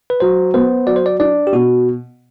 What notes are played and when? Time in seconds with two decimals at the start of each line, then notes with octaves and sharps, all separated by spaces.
0.10 B4
0.20 F#3 C5
0.54 B3 C5
0.86 F#3 D5
0.96 C5
1.06 D5
1.19 D4 D5
1.47 G4
1.52 B2 F#4